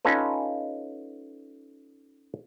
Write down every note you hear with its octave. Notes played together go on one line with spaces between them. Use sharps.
C#4 D#4 F4 A4 B4